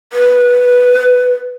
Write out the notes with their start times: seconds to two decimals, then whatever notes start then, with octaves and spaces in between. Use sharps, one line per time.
0.13 B4